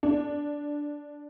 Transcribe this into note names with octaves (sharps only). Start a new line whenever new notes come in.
D4